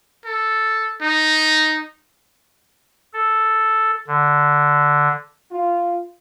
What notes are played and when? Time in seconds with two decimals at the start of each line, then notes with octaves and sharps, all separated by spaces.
0.25 A4
1.01 D#4
3.13 A4
4.07 D3
5.51 F4